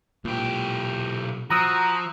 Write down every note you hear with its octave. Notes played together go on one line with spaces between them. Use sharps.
B1 A#2 G4
F3 F#4 A#5 D#6 E6